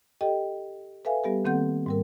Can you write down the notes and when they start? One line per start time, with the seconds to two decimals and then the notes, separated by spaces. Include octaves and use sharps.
0.21 G4 A4 D#5 G5
1.05 A4 B4 E5 F5 G#5
1.24 G3 B3 G4 A4
1.45 D#3 A#3 C4 A4 F#5 G6
1.86 G#2 G3 A#4